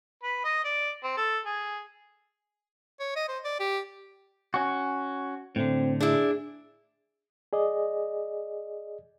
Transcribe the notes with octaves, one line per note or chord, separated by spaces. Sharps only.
B4
D#5
D5
C4
A4
G#4
C#5
D#5
C5
D5
G4
C#4 F#4
A2 D3 C4
D4 E4 G#4
G#4 D5 D#5